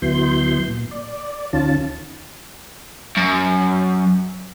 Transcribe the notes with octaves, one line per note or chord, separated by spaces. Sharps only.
D2 F#3 B3 E4 C6 G6
A#2
D5
D2 D#3 C#4 F4 A5
F#2